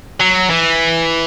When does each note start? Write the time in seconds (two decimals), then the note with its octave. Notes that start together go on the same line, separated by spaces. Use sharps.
0.20 F#3
0.50 E3